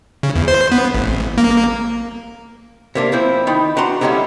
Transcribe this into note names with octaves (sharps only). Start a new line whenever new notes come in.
C#3
E2
C5
B3
A1
A#3
C3 A#3 D4
F3 C4 E4
D#3 D#4 B5
D4 F#4 A#5 C6
D3 G3 G#3 C4 C#4 E4